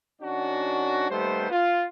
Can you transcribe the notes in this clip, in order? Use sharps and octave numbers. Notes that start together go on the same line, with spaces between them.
D#3 C#4 D4 F#4
D#2 G3 A3 B3 C5
F4